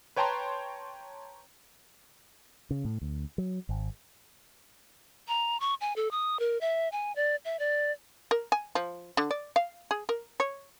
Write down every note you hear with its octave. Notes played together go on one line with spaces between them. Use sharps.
B4 C#5 G5 A5 A#5 C6
C#3
A2
D2
F#3
G#1
A#5
C#6
G#5
A4
D#6
A#4
E5
G#5
D5
E5
D5
A#4
G#5
F3
D3
D5
F5
G#4
A#4
C#5